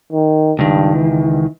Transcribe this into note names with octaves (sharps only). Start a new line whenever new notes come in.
D#3
C#2 G2 D#3
E3